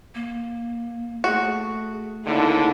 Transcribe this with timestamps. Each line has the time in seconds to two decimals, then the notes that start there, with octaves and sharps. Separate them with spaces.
0.15 A#3
1.24 A3 F#4 G#4
2.25 C#2 D3 A#3 D#4 E4